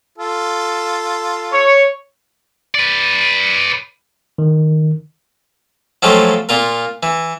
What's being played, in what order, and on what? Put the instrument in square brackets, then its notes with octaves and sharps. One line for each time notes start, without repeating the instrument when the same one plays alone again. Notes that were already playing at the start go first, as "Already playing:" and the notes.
[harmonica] F4 A4
[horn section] C#5
[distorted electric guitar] B4 D5
[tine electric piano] D#3
[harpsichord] F3 F#3 G#3 A3 F4 G4
A#2 F4 A#4
E3